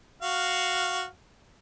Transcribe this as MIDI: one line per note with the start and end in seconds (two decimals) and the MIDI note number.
0.22 1.06 66
0.22 1.06 77